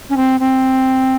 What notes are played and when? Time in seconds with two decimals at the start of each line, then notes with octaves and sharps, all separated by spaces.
0.09 C#4
0.16 C4
0.39 C4